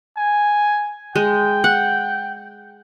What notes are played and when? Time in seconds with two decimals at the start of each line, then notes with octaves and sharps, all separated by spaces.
0.17 G#5
1.16 G#3 G5
1.64 F#5